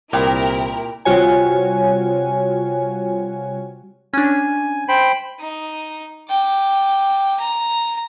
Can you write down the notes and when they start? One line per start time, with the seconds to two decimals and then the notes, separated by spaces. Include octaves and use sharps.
0.13 C2 A#2 E4 A#4 G5 D#6
1.05 C3 G3 F4 F#4 C#5 G#5
4.14 C#4 D4 G#5
4.88 C5 G5 B5
5.39 D#4
6.29 G5 D6
7.39 A#5